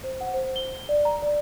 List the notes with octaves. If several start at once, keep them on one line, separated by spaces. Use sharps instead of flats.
C5
F#5
C5
G7
D5
A#5
D5